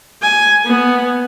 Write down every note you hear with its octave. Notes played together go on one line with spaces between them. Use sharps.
G#5
B3